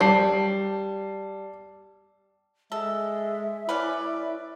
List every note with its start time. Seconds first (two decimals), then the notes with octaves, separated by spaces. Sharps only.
0.01 G3 A5 C7
2.72 G#3 A4 E5
3.69 C#4 E4 B4 D5